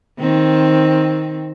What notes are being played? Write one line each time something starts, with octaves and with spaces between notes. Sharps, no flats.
D#3 C4